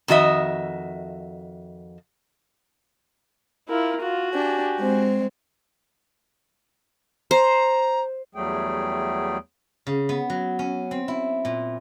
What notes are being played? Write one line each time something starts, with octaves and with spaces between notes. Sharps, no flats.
F2 D#3 F#4 D#5 E5
E4 F4 A#4
F4 F#4
D4 G4 G#5
G#3 C4
C5 A#5
E2 F#3 G3 A3 G#4 G5
C#3
B3
F#3
C#4
C4
E4
A#2